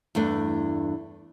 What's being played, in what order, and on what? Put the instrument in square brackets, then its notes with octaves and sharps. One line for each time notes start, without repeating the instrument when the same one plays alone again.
[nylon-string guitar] E2 G2 A3 D4